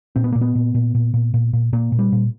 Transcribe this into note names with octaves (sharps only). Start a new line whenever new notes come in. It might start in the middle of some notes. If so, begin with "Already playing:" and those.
A#2 C4
B3
A#2 A#3
B3
A#2
A#2
A#2
A#2
A#2
A#2
A#2 A#3
A#2
G3
A#2